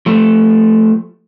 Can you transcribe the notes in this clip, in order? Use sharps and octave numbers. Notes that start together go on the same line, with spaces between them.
F3 A3